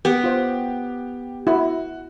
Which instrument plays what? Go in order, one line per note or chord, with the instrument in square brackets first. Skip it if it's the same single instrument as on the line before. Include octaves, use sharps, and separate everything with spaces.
[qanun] B3 [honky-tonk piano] G4
[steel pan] F4 C5
[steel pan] E4 [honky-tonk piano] F#4